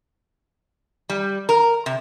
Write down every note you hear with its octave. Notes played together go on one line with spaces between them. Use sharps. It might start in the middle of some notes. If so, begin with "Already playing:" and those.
G3
A#4
C3